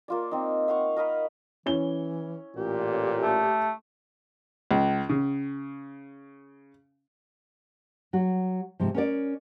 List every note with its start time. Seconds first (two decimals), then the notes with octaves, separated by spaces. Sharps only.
0.08 A#3 F4 D5
0.31 C4 D#4
0.68 F5 F#5 C6 C#6
0.97 A#4 D#5 F5 B5
1.66 E3 C#4 E4 G7
2.57 A1 A#2 G4
3.22 A3
4.71 C#2
5.09 C#3
8.13 F#3 F#4
8.79 G#2 C3 F3
8.95 C#4 A#4 D5